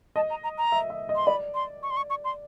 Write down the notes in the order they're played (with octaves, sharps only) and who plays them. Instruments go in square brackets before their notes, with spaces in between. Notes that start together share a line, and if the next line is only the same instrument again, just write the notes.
[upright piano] D#5 [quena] A5
[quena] A#5
A#5
A#5
[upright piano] E5
E5
D#5
[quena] C6
[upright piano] D5 [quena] B5
[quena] C6
C#6
C6
C#6
C#6
C6